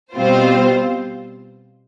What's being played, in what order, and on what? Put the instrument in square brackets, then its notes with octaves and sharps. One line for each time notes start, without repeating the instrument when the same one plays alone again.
[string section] B2 G3 C4 F4 C5